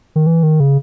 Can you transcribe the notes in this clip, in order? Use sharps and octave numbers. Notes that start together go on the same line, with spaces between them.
D#3
E3
D#3
C#3